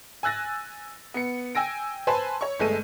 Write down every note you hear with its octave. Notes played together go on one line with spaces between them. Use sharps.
G#5 E6 F#6 A6 A#6
B3 C#7
G5 G#5 E6 A#6 D7
B4 C5 G#5 A5 B5 C6
C#5 C#6
G1 G#3 A3 A4 D#7